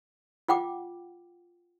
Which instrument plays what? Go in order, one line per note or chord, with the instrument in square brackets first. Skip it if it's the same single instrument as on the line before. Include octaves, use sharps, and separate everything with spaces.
[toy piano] F4 F#5 G5 D6